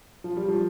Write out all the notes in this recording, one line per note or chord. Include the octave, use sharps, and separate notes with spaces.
F3
G3
F3